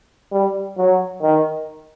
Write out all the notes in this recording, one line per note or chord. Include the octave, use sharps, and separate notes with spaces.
G3
F#3
D#3